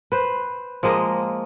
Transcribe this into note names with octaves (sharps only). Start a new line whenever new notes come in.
B4 C5
F3 G#3 A#3 D#5